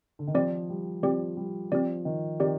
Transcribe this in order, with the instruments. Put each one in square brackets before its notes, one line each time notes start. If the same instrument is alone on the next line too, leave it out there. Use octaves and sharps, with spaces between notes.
[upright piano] D3
D#3
[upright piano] F3 [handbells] C4 G4 D5
[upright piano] G3
[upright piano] F3 [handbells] C4 G4 D5
[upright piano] G3
[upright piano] F3 [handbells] C4 G4 D5
[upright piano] D#3
[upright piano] D#3 [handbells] C4 G4 D5